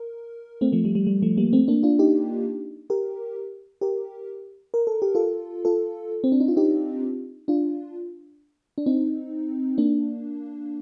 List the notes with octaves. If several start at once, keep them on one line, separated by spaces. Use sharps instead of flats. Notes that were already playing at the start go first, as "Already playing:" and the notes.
Already playing: A#4
A3 C4
F3 A3
G3
G3
G3
F3 A3
G3 A#3
A3 C4
A#3 D4
D4 F4
D#4 G4
G4 A#4
G4 A#4
A#4
A4
G4
F4 A4
F4 A4
C4
D4
D#4
F4
D#4 G4
D4 F4
D4
C4 D#4
A#3 D4